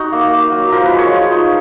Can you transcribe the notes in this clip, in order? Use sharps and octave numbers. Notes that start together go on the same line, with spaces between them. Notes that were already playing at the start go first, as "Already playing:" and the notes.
Already playing: D#4 F#4
A#3
A#3
F#3
F3 A#4
B4
G#3
C#5
F3
D#4